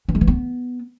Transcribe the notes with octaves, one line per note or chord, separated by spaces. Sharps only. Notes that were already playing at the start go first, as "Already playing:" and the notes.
E3
G#3
E3
B3